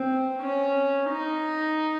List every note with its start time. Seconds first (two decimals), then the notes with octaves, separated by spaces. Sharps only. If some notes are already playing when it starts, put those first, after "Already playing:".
Already playing: C4
0.42 C#4
1.10 D#4